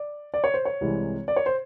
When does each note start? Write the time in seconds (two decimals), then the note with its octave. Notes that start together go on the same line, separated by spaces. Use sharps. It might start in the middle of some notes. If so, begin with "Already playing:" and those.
Already playing: D5
0.34 D5
0.44 C#5
0.54 C5
0.65 C#5
0.81 C2 C3 E3 G#3
1.28 D5
1.36 C#5
1.46 C5